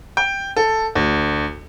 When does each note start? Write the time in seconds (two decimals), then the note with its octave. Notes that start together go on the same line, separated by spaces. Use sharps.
0.17 G5
0.56 A4
0.95 D2